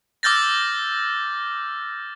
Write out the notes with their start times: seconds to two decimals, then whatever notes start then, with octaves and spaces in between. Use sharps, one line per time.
0.23 D6 E6 F6 G6 A6 A#6